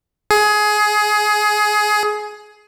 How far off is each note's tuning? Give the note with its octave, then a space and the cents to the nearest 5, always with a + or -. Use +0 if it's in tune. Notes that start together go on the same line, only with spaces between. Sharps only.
G#4 +20